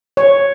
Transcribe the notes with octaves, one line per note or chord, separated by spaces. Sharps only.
C#5